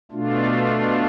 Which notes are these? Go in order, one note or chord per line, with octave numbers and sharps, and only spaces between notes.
B2 A3 D4 F4